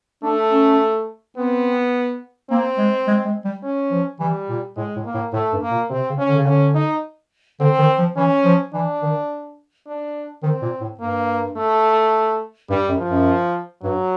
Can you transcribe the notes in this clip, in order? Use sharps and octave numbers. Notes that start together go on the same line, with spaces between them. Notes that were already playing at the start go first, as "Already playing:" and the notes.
A3 D4
C#4
B3 C4
A#3 C4
G#3
G#3
G#3
G3
C#4
F3
E3 G3
A#2
A2 G#3
A2
A#3
A2
A2 A3
G2
A#3
A#2
C3 C4
C#3
C#4
D3
C#3
D3 C#4
D#4
D3 C4
D#3
F3
E3 C#4
F3
E3 D4
D#3
D4
D#3 C4
A#2
A2
G2 A#3
A3
G2 G3
F#2
F3
F#2
G2 F#3